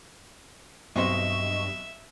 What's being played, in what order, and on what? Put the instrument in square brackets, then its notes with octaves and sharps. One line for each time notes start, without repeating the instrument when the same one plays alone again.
[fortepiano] B1 C4 C6 [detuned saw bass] G2 [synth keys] D#5 C#6 [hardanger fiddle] E5